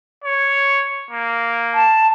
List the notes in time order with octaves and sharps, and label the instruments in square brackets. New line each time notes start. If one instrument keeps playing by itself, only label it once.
[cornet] C#5
A#3
[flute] A5